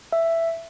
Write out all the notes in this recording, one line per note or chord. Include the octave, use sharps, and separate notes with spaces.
E5